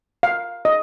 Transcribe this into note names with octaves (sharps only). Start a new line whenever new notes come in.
F5
D#5